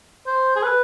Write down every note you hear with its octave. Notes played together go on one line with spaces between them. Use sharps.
C5
G#4
B4